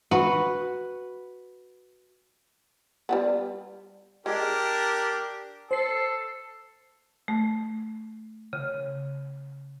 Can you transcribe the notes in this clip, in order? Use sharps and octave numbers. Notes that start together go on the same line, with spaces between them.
F#4 B4
G3 A3 B3
G#3 D4 G4 A#4
A4 C5 C7
A3
C#3